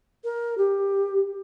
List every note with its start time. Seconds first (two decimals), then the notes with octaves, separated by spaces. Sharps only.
0.24 A#4
0.57 G4